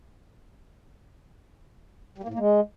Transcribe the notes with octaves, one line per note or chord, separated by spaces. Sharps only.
G3
A#3
A2
A#3
G#3